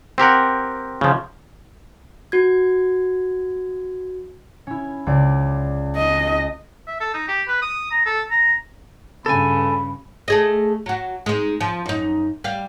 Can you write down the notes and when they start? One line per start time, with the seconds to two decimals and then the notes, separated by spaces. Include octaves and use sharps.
0.18 C4 G4 A#4 F#5
1.01 C#3 F3
2.32 F#4 G#6
4.67 C#4 E4
5.06 C#2 D5
5.96 D#5
6.87 E5
7.00 A4
7.14 D#4
7.28 G4
7.48 B4
7.62 D#6
7.91 A#5
8.06 A4
8.31 A#5
9.26 G2 C#3 A4 G#5 B5
10.28 A3 G#4 D#5
10.86 F#3 F#4
11.26 G#3 D#4
11.61 F3
11.86 F#2 D#4
12.44 G3 F5